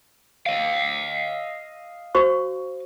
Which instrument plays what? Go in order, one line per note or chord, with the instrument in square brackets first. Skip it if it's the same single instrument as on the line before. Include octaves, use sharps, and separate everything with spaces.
[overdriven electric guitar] D#5 F5
[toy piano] F#4 C5 C#6